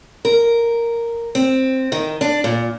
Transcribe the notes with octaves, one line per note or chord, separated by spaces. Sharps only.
A#4
C4
D#3
D4
A#2